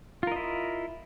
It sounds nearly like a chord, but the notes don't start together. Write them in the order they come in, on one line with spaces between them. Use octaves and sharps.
F4 A#4 D#5 E4